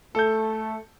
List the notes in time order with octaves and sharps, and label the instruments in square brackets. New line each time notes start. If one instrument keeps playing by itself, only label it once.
[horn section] A3 [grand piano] A4 G6